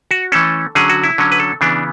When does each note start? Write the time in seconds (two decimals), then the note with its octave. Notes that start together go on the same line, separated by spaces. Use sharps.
0.11 F#4
0.32 E3 A3 C#4 A4
0.75 D3 F#3 C#4 G#4
0.90 F#4
1.04 E4
1.18 D3 F#3 C#4
1.32 B4
1.40 A4
1.61 C#3 E3 B3 D4